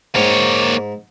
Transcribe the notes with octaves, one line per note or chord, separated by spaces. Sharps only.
G#2 A#3 C#5